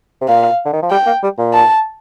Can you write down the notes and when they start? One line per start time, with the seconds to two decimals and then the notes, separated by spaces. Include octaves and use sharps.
0.21 C3
0.28 A#2 F5
0.65 D3
0.73 D#3
0.82 F3
0.91 G3 G5
1.06 A#3
1.23 G3
1.39 A#2
1.54 A5